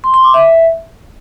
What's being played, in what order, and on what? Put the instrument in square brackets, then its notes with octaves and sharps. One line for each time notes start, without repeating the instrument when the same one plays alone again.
[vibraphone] C6
C6
D6
E5